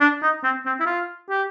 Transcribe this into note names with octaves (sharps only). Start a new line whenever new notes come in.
D4
D#4
C4
C4
E4
F4
G4